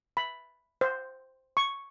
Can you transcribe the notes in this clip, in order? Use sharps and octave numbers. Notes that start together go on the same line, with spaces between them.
B5
C5
C#6